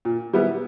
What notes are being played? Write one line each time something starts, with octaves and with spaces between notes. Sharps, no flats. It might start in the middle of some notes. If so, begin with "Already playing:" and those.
A#2
G3 B3 E4